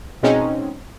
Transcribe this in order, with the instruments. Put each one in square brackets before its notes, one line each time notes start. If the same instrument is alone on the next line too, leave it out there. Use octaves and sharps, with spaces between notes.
[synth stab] B2 G#3 C4 C#4 D#4